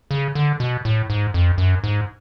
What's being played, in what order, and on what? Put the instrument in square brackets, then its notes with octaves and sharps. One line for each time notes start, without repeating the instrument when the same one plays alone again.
[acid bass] C#3
D3
B2
A2
G#2
F2
F#2
G#2